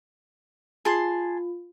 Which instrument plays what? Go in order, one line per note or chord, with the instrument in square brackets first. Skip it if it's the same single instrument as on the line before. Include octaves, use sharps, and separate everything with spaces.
[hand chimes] F4 [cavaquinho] G#4 A5 C6